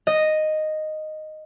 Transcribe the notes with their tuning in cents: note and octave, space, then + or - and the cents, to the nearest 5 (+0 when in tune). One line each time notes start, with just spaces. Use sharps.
D#5 -5